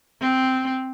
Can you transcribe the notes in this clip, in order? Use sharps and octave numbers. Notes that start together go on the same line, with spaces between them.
C4